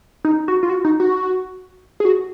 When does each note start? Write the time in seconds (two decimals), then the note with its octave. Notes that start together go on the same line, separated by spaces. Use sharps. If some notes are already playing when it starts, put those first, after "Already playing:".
0.25 D#4
0.48 F#4
0.63 F4
0.69 F#4
0.85 D#4
1.00 F#4
2.00 G#4
2.05 F#4